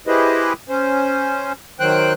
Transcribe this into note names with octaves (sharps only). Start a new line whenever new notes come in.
E4 G4 G#4 B4 C5 D#5
C#4 C5
D#3 F#3 C5 G5 F#6